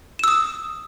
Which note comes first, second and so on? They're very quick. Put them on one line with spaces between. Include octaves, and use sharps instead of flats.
E7 E6 D#6